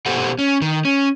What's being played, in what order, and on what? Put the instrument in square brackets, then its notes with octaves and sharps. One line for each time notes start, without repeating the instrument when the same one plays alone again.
[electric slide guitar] B2 G4 A4 C5 F#5
C#4
D#3
C#4